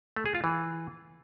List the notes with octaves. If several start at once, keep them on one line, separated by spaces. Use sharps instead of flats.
A3
G#4
F4
E3